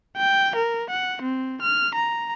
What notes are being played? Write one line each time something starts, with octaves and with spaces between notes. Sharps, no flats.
G5
A#4
F#5
C4
F6
A#5